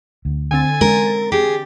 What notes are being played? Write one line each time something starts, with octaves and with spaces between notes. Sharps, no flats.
D2
D3 C4 G#5 A6
G#3 C#4 A#4
G4 G#4